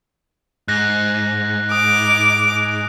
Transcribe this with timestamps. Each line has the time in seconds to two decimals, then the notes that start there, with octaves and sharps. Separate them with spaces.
0.68 G#2 F#6 A#6
1.71 D6 D#6